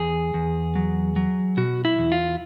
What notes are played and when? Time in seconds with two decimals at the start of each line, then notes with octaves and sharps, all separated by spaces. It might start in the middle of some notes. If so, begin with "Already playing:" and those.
Already playing: E2 G#4
0.34 E2
0.75 F#3
1.16 F#3
1.57 B2 F#4
1.85 E4
1.98 E2
2.12 F4